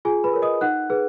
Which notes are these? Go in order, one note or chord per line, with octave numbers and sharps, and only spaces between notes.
F4 G#4 G#5
B4 B5
A#4 C#5
D#5 D#6
D#4 F#5 F#6
G#4 B4